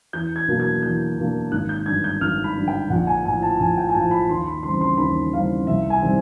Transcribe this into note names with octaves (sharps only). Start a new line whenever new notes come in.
E2 G6
G#6
B2 F#3 A#3 D4
G#6
E2 G6
B2 F#3 A#3 D4
G#1 F#6
G6
G2 D3 G#6
G6
G#1 F6
B5
G2 D3
G5
A#1 F#5
G#5
A2 F3 G#5
A5
A#1 G#5
G5
G#5
A2 F3 A5
B5
D#2 C6
B5
C#3 E3 G3 C4 C6
C6
D#2 B5
C#3 E3 G3 C4 F5
C2 E5
G#5
C3 D#3 G3 C4